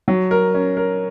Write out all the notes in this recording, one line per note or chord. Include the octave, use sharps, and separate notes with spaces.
F#3
A#4
C#4
A#4